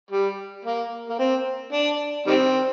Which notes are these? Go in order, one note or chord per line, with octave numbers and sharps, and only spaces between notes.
G3
A#3
A#3
C4
D4
D#3 G3 C4